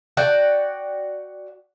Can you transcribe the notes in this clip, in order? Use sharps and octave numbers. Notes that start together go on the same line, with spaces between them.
F#4 D5 F#5 G5